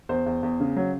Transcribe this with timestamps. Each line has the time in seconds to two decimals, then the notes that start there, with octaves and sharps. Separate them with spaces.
0.09 E2 C5
0.26 E2
0.43 E2
0.60 C#3
0.77 F#3